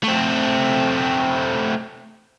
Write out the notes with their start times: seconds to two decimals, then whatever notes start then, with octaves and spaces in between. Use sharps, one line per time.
0.04 A3 C4